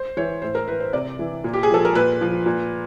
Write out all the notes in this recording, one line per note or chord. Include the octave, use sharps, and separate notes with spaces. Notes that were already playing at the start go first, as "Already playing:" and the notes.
Already playing: C5
E3 C#5
A2 C5
A#4
E3 B4
C5
C3 D5
E3
A#2
G4
G#4
F3 A4
A#4
A#2 B4
F3
A#2